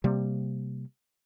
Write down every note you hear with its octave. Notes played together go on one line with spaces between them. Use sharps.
C3 G3 A#3